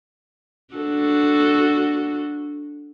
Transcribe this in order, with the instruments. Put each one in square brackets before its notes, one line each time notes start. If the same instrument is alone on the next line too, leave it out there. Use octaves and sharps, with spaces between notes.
[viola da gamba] D4 F#4 A4